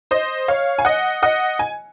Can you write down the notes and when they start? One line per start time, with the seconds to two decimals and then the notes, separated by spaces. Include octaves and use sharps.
0.11 C5 D#5
0.48 C#5 F5
0.79 G#5
0.85 D#5 F#5
1.23 D#5 F#5
1.59 G#5